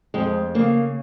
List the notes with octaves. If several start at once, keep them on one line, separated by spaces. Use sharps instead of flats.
F2 G#3
C#3 A#3